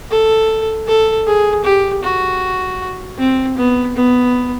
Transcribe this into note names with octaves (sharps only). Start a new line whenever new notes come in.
A4
A4
G#4
G4
F#4
C4
B3
B3